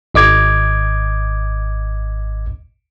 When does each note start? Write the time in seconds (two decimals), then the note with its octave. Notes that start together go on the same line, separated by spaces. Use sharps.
0.14 G#1 D#5 D6 G#6